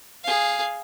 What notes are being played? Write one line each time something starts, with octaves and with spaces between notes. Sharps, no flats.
G#4 F5